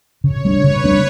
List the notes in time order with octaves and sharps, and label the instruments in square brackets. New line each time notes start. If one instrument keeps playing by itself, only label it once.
[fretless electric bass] C#3 [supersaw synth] C#5
[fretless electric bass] G3 B3 D4
[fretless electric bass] C#3 [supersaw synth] B4
[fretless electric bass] G3 B3 D4